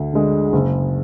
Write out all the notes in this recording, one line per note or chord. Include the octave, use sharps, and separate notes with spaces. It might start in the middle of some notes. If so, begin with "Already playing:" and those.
Already playing: D2
D3 G#3
F#1